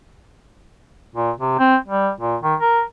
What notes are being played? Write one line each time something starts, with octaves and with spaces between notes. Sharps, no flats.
A#2
C3
C4
G3
A#2
D#3
A#4